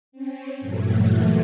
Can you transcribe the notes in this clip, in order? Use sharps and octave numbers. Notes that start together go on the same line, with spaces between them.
C4 C#4
G2 A#2 E3 F#3 A3